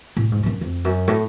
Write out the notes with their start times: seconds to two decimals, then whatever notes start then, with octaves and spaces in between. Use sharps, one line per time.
0.17 A2
0.32 G#2
0.43 G#2
0.46 F#2
0.61 F2
0.85 F#2
1.08 A2